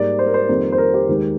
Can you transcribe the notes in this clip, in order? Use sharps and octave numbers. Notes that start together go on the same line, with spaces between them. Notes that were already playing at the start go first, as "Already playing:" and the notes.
Already playing: G#2 G3 A#3 D5
C5
A#4
C5
F2 D#3 G3 A#3
C5
A#4
G4
D#2 D#3 G#3